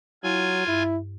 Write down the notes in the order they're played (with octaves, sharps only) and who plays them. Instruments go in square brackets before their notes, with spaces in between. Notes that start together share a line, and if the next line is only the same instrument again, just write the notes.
[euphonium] F#3 [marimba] E4 [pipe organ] F4 G#5
[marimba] G2 [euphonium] E4